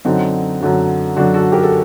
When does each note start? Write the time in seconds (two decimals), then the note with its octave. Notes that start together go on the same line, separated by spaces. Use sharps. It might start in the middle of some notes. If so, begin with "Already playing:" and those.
0.05 F#2 D3 F#3 C4 D#4
0.61 F#2 D3 F#3
1.16 F#2 D3 F#3 D4 F#4
1.34 F#4 A4
1.52 G4 A#4
1.63 A4